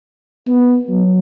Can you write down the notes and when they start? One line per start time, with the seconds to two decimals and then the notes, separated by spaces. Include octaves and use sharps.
0.47 B3
0.89 F#3